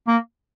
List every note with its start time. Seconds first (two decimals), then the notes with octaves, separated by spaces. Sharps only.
0.07 A#3